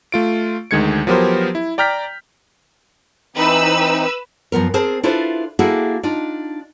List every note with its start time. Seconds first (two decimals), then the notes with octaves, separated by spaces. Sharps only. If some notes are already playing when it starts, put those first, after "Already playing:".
0.12 A3 F4 D7
0.71 D2 D#3 G#3 G#6 C#7
1.07 F3 F#3 B3 G4 A#4 C5
1.55 E4
1.78 D5 G5 A#5 F6 G6 B6
3.36 E3 C4 D#4 B4 E6
4.52 F#2 F3 B3 A#4
4.74 C4 G#4 A#4 C5 A5
5.03 D4 E4 F4 A4 B4 C5
5.59 A#3 D4 E4 F#4 G#4 A4
6.03 D4 D#4 F4